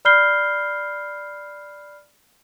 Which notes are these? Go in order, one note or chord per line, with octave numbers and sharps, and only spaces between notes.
D5 B5 F6 G6 C7 G7